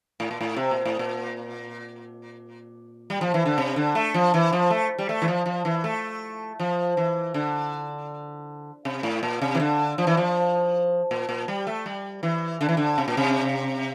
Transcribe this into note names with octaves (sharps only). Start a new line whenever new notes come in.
A2
A#2
A2
C3
A#2
A2
A#2
G3
F3
E3
D3
C3
D3
A3
F3
E3
F3
A3
G3
A3
E3
F3
F3
E3
A3
F3
E3
D3
C3
A2
A#2
C3
E3
D3
F3
E3
F3
A#2
A#2
G3
A3
G3
E3
D3
E3
D3
C3
A#2
C3